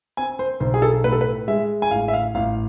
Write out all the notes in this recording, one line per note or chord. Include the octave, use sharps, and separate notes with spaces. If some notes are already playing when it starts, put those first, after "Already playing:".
C4 G#5
C5
B1 C5
G#4
A4
A2 B4
A4
B4
G#3 E5
G#5
A1 F5
E5
F5
A1 F5